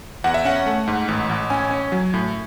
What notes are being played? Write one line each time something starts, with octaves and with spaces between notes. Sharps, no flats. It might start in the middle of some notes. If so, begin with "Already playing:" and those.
E2 F#5
E5
C#4 F#5
A3
G#2
A1
A1
C#4 G#5
C#4
F#3
A2